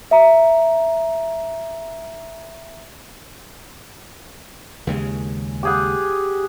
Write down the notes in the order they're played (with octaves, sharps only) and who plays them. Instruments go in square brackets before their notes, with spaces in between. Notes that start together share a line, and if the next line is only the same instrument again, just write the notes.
[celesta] E5 A#5
[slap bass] D#2 C#3 G#3
[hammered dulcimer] G4 G#4 F#5